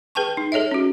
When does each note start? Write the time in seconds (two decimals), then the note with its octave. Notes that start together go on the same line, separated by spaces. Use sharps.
0.15 G#4 B4 G5 A5 C#6
0.37 D#4
0.52 G#4 A4 C#5 D#5 E5
0.71 C#4 F#4